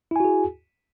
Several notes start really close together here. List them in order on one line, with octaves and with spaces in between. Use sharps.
E4 G#5 F#4 G#4